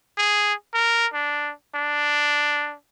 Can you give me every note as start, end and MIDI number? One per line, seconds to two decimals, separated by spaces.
0.18 0.54 68
0.74 1.07 70
1.13 1.52 62
1.75 2.74 62